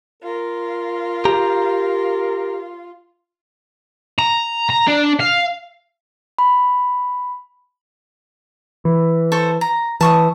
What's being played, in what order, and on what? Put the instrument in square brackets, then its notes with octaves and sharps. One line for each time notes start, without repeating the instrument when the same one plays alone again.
[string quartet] F4 [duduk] A#4
[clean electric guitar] G4 A#5
[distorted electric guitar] A#5
A#5
D4
F5
[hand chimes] B5
[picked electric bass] E3
[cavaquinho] A4 C5 C#6
A#5
[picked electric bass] E3 [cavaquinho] A5 C#6 D#6